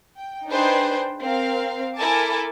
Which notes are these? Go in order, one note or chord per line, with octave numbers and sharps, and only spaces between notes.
G5
D4 D#4 G#4 B4 C5 G5
C4 A#4 F5
E4 A4 A#4 G#5 A5 D6